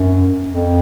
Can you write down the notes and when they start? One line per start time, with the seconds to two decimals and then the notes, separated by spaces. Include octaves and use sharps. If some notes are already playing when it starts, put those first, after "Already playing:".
Already playing: F#2
0.48 F2